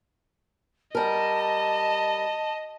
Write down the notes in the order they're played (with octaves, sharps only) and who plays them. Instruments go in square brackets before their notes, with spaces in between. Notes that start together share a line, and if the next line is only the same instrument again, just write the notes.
[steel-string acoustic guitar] G3 A#4 [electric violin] D#5 [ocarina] A5